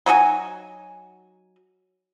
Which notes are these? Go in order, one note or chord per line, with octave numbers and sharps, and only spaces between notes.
F#3 D#4 F#4 G#5